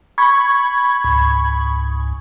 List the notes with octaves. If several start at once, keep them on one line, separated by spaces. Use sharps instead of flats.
B5 C#6 G#6
C#2 G#2